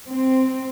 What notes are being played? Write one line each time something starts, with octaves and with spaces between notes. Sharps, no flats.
C4